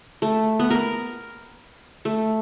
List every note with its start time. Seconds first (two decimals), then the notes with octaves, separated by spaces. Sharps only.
0.22 A3
0.59 B3
0.70 A#4
2.05 A3